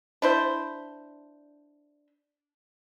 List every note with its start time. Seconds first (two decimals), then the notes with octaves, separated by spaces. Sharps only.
0.22 D4 E4 C5